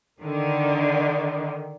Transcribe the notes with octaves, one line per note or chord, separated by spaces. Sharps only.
D3 D#3